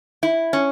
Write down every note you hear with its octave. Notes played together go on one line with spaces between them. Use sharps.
E4
C#4